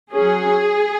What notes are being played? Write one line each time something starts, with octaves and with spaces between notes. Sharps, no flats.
F#3 C#4 G#4